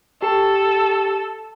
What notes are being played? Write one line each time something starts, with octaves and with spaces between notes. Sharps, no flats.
G4 A4